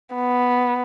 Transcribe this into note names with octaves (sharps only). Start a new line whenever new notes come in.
B3